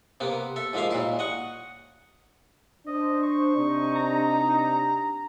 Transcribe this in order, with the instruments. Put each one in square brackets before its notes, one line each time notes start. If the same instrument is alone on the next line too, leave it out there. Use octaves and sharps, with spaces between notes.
[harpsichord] C3 A#3 B3
A4 E5
G#2 F3 A#3 E5 F5
D#2 A#2 E4
D#5 F#5 C#6
[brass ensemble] D4 C5 [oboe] D#5
[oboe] C#6
[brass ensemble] C3 D4 D#4
[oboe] A#5